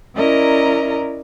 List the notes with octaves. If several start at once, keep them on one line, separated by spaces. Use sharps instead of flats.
C#4 E4 A#4 D5 D#5 A#5